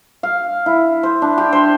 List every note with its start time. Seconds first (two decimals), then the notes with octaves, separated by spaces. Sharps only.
0.23 F5
0.66 E4
1.03 C5
1.22 D4
1.38 G4
1.53 C5